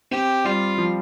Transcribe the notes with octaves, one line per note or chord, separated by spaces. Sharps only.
C4 G4
G3 F4
F3